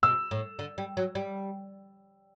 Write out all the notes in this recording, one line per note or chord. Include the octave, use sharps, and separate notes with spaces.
B2 E6
A2
D3
G3
F#3
G3